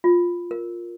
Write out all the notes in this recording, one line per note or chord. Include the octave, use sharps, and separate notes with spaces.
F4
A#4